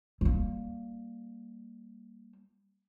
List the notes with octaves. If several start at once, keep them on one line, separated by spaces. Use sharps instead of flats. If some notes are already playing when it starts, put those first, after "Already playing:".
G3 A#3